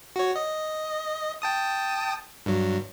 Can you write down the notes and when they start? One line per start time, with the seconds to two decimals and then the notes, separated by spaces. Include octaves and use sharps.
0.16 F#4 C#5
0.36 D#5
1.42 G5 A5 D#6
2.46 G2 F#3